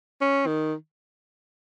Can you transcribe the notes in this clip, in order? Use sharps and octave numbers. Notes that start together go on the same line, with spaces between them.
C#4
D#3